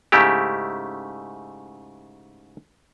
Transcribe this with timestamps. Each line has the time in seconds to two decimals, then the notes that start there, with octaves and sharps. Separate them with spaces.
0.12 G#2 C#3 A3 E4 G4